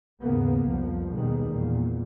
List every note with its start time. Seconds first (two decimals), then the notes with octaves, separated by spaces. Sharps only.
0.22 D#2 G#2 C#3 A#3 B3
0.65 C2 F2 F3
1.13 D#2 B2 D#3 G3 G#3
1.51 E2 A#2